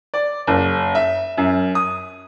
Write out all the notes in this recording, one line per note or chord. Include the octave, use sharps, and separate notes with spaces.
D5
F#1
E5
F#2
D#6